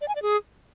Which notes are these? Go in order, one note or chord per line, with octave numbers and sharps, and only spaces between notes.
D5
G#5
D5
G#4